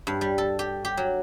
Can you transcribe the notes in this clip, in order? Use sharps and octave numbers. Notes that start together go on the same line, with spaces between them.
G2
G3
A4
G4
G4
F#3